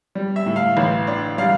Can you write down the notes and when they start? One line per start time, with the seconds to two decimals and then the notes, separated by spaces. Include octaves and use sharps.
0.15 G3
0.36 E5
0.46 A2
0.56 F5
0.77 A1
1.07 D4
1.38 G3 F5